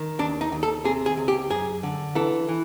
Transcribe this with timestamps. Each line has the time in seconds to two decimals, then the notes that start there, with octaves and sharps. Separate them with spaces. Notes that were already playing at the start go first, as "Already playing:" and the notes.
Already playing: D#3
0.19 D#2 D4
0.41 D#4
0.52 D#2
0.63 A4
0.84 C3 G#4
1.06 G#4
1.17 C#2
1.28 G4
1.50 F#2 G#4
1.83 D3
2.15 E3 A4
2.49 E3